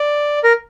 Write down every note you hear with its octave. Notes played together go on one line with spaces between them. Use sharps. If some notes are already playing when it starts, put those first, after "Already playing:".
Already playing: D5
A#4